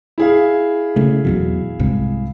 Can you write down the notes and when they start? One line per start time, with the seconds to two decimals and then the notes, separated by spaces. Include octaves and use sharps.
0.18 E4 G#4 F5
0.96 C#3 A3
1.25 E2 B2 F#3
1.80 C2 G#2 C3